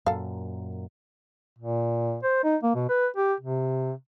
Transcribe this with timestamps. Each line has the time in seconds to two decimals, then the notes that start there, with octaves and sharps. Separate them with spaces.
0.06 F#2 A#2 A4 F5
1.59 A#2
2.23 C5
2.44 D#4
2.63 A#3
2.75 B2
2.89 B4
3.16 G4
3.40 C3